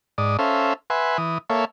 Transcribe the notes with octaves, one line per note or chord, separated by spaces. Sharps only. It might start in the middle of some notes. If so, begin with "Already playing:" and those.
G#2 D5 D#6
C#4 A4 C5 E5 F5
B4 E5 F#5 G#5 C6
E3 D#6
A#3 A4 C#5 E5 F5